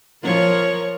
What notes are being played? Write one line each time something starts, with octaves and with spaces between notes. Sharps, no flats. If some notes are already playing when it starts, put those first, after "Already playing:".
F3 A#4 C#5